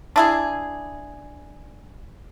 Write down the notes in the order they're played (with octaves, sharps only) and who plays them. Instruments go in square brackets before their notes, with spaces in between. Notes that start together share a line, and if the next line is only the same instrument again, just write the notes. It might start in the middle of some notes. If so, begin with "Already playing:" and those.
[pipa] D4 E4 G#4